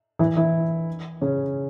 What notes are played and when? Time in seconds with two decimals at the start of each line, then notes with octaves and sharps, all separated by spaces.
0.19 E3 E4
0.36 E3 E4
1.21 C#3 C#4